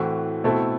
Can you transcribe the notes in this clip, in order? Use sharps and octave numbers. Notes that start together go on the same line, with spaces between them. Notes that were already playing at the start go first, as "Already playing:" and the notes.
Already playing: A2 E3 A3 C4 F#4
B2 A3 C4 E4 A4